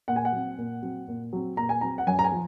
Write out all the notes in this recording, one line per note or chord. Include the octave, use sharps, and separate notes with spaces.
A#2 F#5
G#5
F#5
F#3 C4
A#2
F#3 C4
A#2
F#3 C4
A#2 A#5
G#5
F#3 C4 A#5
F#5
F#2 G#5
A#5
G#5
F3